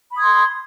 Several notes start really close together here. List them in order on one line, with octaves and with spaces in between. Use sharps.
B5 D#6 G#6 C6